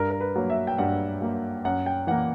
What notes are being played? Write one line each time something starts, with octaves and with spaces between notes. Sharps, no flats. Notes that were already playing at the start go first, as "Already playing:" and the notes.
Already playing: G2 A#4
A#4
B4
F#3 A#3
E5
G5
G2 F#5
F#3 A#3
F#2 F#5
G5
E3 A#3 F#5